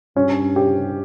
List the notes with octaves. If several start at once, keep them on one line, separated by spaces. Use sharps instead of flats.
G2 C#4
G4